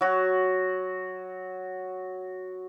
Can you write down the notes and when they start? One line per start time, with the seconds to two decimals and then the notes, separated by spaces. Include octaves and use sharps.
0.01 F#3 F#4